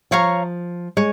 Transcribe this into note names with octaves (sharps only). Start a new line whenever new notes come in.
F3 C#5 F5 A#5 C#6
G#3 C#5